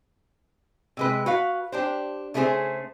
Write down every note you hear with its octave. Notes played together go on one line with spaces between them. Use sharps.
C3 G#3 B4
F#4 B4 F5
D4 G4 C5
C#3 A3 C#4 D#4 G#4 C5